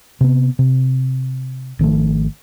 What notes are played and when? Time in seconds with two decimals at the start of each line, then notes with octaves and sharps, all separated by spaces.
0.21 C3 B3
0.59 C3
1.79 G#1 D#3 F3 A3